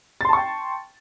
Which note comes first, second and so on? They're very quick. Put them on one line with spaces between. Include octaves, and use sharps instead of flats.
A6 C6 A5 C#6 G5